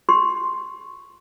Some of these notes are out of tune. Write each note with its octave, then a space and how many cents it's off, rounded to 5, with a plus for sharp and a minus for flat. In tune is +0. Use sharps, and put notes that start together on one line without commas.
G4 +0 C6 +0